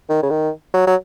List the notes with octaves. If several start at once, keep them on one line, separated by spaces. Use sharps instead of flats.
D#3
C#3
D#3
F#3
F#3